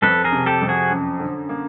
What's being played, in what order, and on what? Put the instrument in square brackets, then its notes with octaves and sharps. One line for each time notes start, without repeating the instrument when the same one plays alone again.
[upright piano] F2 [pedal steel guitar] A4 B4
[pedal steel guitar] G#4 A#4
[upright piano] C3
[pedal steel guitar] G4 A4
[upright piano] F2
[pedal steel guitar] F#4 G#4
[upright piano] F#2
D3
A#3